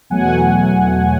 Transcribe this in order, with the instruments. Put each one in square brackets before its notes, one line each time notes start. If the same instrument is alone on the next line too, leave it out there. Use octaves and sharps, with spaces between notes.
[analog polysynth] E2 B2 F#3 A3 F#5 G#5